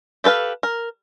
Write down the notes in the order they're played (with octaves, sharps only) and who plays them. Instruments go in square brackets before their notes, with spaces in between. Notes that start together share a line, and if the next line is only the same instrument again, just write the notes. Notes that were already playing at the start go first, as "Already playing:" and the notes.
[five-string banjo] G4 A4 B4 F5
A#4